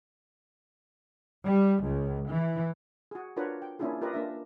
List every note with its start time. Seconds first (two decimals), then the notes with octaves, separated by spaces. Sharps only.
1.47 G3
1.83 C#2
2.29 E3
3.11 F#4 G#4
3.37 D4 F4 F#4 A#4 B4 C#5
3.62 G5
3.79 A#3 C#4 D4 E4 F4 G#4
4.01 F4 G4 A#4 B4 D#5
4.14 A#3 D4 E5